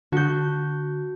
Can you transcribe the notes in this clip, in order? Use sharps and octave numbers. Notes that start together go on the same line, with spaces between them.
D3 F#4 G6